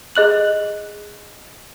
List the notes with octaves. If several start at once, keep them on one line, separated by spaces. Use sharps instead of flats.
G#4 D#5 F#6 F#7